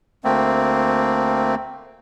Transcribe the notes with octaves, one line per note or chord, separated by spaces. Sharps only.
D2 A3 A#3 C4